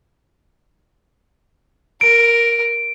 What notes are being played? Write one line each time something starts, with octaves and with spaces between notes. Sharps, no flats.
A#4 D7